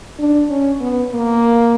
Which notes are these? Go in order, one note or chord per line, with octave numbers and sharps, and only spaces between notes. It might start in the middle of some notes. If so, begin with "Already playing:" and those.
D4
C#4
B3
A#3